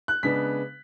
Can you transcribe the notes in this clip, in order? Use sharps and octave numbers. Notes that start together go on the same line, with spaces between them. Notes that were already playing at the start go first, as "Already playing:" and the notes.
F#6
C#3 G#3 B3 D4 B6